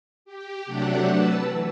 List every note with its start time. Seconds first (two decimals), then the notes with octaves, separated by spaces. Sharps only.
0.25 G4
0.66 C3 F#3 A3 D4 G4 F#5
1.08 B4 A5 E6
1.37 E3